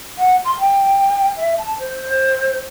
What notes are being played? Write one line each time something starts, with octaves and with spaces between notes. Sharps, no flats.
F#5
C6
G5
E5
A5
C5